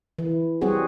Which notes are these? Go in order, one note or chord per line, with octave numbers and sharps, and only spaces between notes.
E3
F#3 G3 C4 F#4 G#4